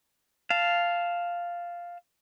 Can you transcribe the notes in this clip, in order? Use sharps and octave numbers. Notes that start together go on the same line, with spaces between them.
F5 A5